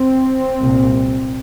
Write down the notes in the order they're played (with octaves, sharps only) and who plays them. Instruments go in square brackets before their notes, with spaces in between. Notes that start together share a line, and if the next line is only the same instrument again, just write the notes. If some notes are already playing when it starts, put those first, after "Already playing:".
Already playing: [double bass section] C4
C2 A#2